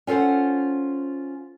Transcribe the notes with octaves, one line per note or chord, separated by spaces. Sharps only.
C#4 F4 A4 C5 F#5